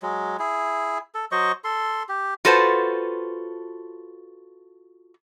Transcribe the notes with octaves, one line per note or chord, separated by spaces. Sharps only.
F#3 G#3
E4 G#4
A4
F#3 C5 D#5 C#6
A4 C6
G4
F4 F#4 A4 B4 C5 F#5